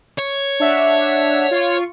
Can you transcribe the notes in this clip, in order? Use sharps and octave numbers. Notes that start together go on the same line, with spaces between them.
C#5
D4 E5 F#5
F4 C#6